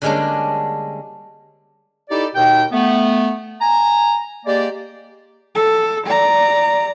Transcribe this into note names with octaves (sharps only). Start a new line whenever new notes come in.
D3 G3 G#3 A#3 C#4 D4
D#4 E4 G4 A4 D5
D#2 B2 D#4 G5
A3 B3
G#5 A#5
G#3 A#3 G4 D5
A4
D5 A#5